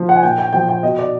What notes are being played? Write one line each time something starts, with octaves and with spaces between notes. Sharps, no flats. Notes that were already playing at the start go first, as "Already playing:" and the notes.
Already playing: F3
F#5
G#5
A#2 G5
G5
F3 G5
G5
B2 D#5
D5